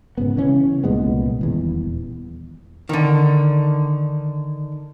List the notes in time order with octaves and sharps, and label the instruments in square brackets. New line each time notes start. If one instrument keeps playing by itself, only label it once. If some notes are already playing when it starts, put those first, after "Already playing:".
[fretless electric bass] G#2 C#3 B3
C#3 E3 C#4
C2 A#2 G#3 B3
D#1 E2
[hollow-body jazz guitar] D3 D#3